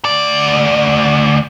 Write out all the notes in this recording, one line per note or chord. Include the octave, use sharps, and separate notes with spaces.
D2 D5